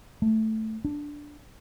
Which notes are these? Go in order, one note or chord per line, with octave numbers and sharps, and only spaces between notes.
A3
D4